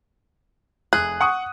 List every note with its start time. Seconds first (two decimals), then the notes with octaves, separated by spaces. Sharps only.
0.93 F1 G#4 F#6
1.21 F#5 C#6 D#6